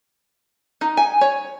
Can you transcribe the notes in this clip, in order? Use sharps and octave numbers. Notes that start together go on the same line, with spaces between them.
D#4
G#5
C#5